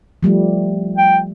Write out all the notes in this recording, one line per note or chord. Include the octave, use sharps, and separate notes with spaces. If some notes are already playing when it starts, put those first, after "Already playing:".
F3 G3 A3
G5